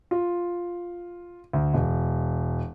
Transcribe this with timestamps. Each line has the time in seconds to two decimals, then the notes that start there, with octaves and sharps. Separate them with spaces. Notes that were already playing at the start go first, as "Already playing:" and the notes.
0.11 F4
1.53 D2
1.74 E1